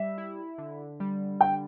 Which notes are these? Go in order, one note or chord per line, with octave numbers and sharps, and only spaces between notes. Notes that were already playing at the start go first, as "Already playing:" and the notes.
Already playing: G3 E5
E4
D3
G3
D3 G5